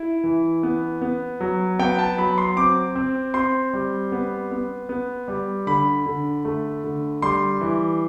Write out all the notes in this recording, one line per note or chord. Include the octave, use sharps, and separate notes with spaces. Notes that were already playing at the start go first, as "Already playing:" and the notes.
Already playing: E4
E3
B3
B3
F#3
B3 G5
A5
F#3 B5
C6
C4 D6
C4
C4 C6
G3
B3
B3
B3
G3
D3 B5
D3
A3
D3
G3 C6
E3